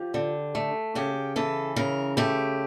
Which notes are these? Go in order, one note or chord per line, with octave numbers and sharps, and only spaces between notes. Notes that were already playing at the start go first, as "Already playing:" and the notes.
Already playing: F3 G4
D3
A3
C#3 G4
E3 A4
C#3 A#4
A3 G4